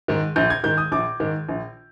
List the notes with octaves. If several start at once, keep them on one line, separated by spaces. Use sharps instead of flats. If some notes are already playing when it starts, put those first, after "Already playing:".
G#2 D#3
A#1 G6
G#6
G#2 D#3 G6
D#6
A#1 D6
G#2 D#3
A#1